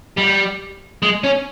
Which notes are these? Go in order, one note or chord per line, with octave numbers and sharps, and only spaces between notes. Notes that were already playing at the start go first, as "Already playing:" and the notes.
G3
G#3
C#4